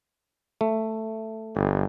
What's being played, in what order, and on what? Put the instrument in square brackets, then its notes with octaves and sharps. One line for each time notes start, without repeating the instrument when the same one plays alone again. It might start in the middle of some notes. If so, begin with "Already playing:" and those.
[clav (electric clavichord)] A3
[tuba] G1